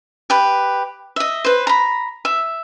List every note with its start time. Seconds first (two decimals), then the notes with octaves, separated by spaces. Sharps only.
0.30 G4 B4
1.16 D#5 E5
1.45 B4 C5
1.67 A#5 B5
2.25 E5